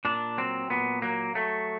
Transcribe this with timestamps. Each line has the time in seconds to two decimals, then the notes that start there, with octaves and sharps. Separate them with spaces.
0.05 A#2 D4
0.38 F#3 C4
0.70 A#2 B3
1.02 F#3 A#3
1.35 F#3 A3